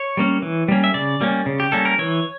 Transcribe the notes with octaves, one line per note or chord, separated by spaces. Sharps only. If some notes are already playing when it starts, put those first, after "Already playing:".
Already playing: C#5
G3 A#3 C#4
E3
G3 A#3 C#4
E5
C#3 D5
G3 A#3 C#4
C#3
G4
G3 A#3 C#4 A4
A#4
E3 C#5